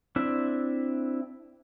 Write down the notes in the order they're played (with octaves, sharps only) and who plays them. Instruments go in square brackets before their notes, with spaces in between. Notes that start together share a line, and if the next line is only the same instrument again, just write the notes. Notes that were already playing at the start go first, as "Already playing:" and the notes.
[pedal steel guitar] C4 D4 E4 E5